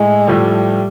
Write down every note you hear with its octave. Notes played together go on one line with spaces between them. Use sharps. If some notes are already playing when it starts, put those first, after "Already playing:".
Already playing: A2 G#3
A2 F3 G3 A3